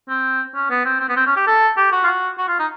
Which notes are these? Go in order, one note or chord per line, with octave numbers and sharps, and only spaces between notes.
C4
C#4
B3
C4
C4
B3
C4
C#4
G4
A4
G4
F#4
F4
F#4
F#4
F4
D#4